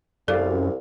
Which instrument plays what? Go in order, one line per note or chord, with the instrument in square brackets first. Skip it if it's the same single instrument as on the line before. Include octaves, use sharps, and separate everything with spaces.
[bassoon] C2 [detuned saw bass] F#2 [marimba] A4 [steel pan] D5 F5